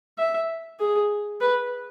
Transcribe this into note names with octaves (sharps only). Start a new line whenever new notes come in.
E5
G#4
B4